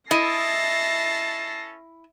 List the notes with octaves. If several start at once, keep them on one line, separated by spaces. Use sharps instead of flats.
C#4 E4 A4 D#5 A5 A#6 C7